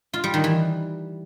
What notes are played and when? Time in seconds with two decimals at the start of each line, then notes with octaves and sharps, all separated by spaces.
0.13 F4
0.24 G3
0.34 D#3
0.44 E3